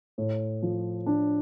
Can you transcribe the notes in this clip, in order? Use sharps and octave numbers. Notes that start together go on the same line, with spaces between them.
A2
F3
D4